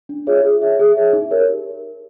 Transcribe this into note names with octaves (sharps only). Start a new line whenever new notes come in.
D4
F4 G#4 C#5 E5
G#4
C#5 E5
G#4
C#5 E5
D#4
G4 A#4 C#5